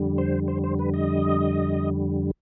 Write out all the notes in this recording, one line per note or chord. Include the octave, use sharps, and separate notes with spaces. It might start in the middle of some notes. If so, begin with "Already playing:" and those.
Already playing: F2 D3 G3
C5
C5
C5
B4
D#5